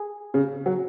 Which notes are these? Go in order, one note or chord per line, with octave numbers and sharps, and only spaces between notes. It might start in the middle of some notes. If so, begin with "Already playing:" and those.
Already playing: G#4
C#3
F#3